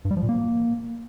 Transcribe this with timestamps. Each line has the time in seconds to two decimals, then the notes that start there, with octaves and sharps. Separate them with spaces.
0.05 G2
0.11 G3
0.17 F3
0.23 A#2
0.29 A#3